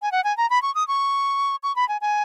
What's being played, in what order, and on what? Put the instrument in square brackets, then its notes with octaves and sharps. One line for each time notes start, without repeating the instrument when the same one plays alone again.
[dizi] G#5
F#5
G#5
A#5
B5
C#6
D#6
C#6
C#6
B5
G#5
G#5